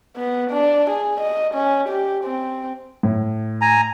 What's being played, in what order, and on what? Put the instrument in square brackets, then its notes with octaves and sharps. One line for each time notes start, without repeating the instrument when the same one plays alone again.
[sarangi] B3
D4
G#4
D#5
C#4
G4
C4
[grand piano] A2
[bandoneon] G#5 A#5